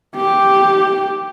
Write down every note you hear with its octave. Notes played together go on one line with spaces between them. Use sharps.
G4